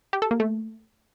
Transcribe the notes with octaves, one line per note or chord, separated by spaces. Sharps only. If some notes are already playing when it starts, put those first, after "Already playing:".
G4
A4
A#3
A3